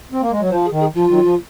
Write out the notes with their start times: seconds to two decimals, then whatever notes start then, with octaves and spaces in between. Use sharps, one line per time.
0.12 C4
0.22 A#3
0.31 G#3
0.41 F#3
0.50 F3 C5
0.65 G#4
0.72 D#3
0.80 G#4
0.95 F3 F4
1.10 D#3 F#3
1.24 F3